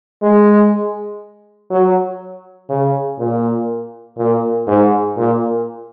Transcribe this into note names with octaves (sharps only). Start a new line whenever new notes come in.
G#3
F#3
C#3
A#2
A#2
G#2
A#2